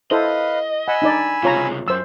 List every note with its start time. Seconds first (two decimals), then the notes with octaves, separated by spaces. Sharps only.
0.11 E4 A4 B4 C5 D#5 F5
0.88 F#5 G#5 B5 E6
1.02 D4 D#4 D5
1.43 C#2 C3 F4 C#5 A#5
1.88 F#2 C5 E6